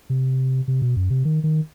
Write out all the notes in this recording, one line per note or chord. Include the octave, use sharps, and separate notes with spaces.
C3
C3
B2
F#2
C3
D#3
D#3